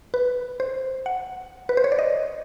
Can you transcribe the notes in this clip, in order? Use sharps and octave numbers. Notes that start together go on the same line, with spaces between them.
B4
C5
F#5
B4
C5
C#5
D5
D#5